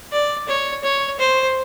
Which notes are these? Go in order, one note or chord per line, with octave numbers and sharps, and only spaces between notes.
D5
C#5
C#5
C5